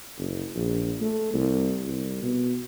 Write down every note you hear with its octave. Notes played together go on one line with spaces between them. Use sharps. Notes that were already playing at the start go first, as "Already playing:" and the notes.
F#1
A#1
A3
C2
C2
B2